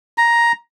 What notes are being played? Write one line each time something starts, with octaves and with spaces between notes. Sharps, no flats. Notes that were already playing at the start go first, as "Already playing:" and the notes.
A#5